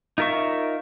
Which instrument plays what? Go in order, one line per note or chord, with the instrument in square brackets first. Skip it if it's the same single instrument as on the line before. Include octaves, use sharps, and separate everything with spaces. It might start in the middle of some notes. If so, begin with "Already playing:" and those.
[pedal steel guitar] D#4 F4 A#4 E5 C#6